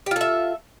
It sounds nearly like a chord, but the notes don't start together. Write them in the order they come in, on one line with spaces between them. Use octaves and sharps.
G4 F4 A4 E5